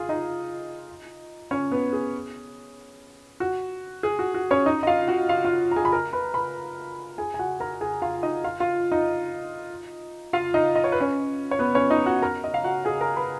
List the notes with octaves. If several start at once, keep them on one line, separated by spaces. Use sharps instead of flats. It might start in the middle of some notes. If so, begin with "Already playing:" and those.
Already playing: F4 G#4 F5
D#4 D#5
C#4 C#5
B3 B4
G#4
F#4
G#4
F#4
F#4
C#4 C#5
D#4 D#5
D#5
F4 F5
F#4 F#5
F4 F5
F4 F5
A#5
G#4 G#5
B5
A#4 A#5
B4 B5
B4 B5
G#4 G#5
G#5
F#4 F#5
A#4 A#5
G#4 G#5
F4 F5
D#4 D#5
F4 F5
F4 F5
D#4 D#5
F4 F5
D#4 D#5
D#5
C#5
B4
C#4 C#5
C#5
B3 B4
C#4 C#5
D#4 D#5
F#4 F#5
A#4 A#5
D#5
F5
F#4 F#5
G#4 G#5
A#4 A#5
B4 B5